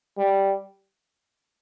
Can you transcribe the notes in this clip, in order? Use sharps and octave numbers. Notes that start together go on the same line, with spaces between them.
G3